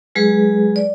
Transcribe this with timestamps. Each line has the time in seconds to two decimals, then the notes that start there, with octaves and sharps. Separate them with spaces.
0.15 F#3 G#3 G#4 B4
0.76 D5